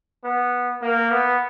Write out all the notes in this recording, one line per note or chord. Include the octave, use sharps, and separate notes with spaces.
B3
A#3
B3